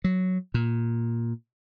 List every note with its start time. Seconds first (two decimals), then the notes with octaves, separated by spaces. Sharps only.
0.04 F#3
0.54 A#2